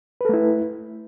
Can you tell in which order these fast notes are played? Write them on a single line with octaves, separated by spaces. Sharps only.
B4 A4 A3 E4